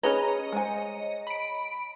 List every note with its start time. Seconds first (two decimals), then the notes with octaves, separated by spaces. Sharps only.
0.03 C#4 G#4 B4 C#5 D#5 A#5
0.52 G#3 C5 G#5
1.27 B5 D7